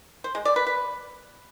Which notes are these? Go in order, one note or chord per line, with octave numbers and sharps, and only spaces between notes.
C5
G#3
D5
B4
B4